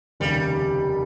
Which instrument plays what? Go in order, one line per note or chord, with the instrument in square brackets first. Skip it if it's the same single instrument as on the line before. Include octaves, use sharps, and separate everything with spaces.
[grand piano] F1 D#2 C#3 [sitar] G3